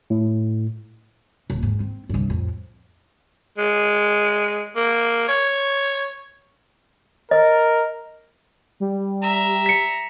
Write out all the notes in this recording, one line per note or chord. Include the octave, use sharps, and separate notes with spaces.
A2
D#1
G#2
C4
C2 G2
F2 A2
G#3
A#3
C#5
A#4 D#5
G3
E5 A#5
B6 C#7